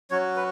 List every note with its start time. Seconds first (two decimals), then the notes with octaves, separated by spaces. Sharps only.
0.11 F#3 C#4 F#4 C#5
0.36 B4